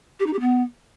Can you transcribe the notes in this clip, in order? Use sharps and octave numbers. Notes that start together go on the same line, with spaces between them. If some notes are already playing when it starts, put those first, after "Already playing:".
G4
D#4
G4
B3